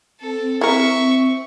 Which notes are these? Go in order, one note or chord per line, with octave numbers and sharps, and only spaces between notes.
C4 A4
E4 A#4 E5 C#6